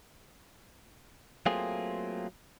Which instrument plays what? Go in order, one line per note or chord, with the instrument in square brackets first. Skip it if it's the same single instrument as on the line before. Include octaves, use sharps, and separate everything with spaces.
[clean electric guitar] F#3 A3 A#3 C4 F4 G#4